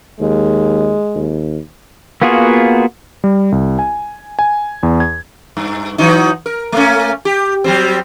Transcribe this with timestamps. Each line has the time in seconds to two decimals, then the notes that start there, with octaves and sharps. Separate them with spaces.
0.20 D#2 G#3
1.15 D#2
2.22 A#3 B3 F4 F#4 G#4
3.24 G3
3.52 C2
3.79 G#5
4.39 G#5
4.83 E2
5.00 G#6
5.57 G2
5.98 E3 F#3 D#4
6.46 A#4
6.72 A3 A#3 C#4
7.25 G4
7.64 F#3 G3 C4